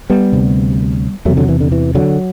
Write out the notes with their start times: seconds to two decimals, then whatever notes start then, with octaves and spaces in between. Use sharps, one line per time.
0.10 G3 B3
0.32 D2 C3
1.25 E2 F#3 A3
1.30 C3
1.37 D3 F#3
1.48 E3
1.60 D3
1.72 E3
1.95 D3 F#3